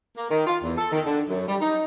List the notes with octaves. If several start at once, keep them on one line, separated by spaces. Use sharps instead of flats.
A#3
D#3
F4
E2
A4
D#3
D3
F#2
G3
D#4